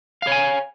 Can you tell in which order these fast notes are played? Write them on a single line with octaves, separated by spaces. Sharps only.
F5 C#5 G#5